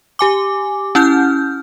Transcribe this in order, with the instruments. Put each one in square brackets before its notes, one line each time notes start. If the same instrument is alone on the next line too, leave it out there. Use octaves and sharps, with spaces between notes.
[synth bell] G4 G#5 D6
C#4 E4 F6 G6